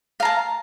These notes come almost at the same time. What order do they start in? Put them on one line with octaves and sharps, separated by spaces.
F5 A#5 A5